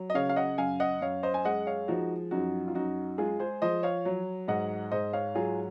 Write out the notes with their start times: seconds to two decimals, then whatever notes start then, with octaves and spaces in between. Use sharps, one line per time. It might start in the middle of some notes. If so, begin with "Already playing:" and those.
Already playing: F#3
0.10 D#5
0.14 C#3 C#5 F5
0.29 F5
0.36 D#5 F#5
0.58 F#2 F5 G#5
0.80 D#5 F#5
1.02 F#2 C#5 F5
1.23 C5 D#5
1.34 G#5
1.45 G#3 D#5 F#5
1.67 C#5 F5
1.88 F3 D#4 F#4
2.31 F#2 D#4 F#4
2.68 F4
2.75 F#2 D#4 F#4
3.18 G#3 F4 G#4
3.39 G#4 C5
3.62 F3 C5 D#5
3.83 C#5 F5
4.05 F#3
4.48 G#2 D#5 F#5
4.92 G#2 C5 D#5
5.13 C#5 F5
5.35 F#3 F4 G#4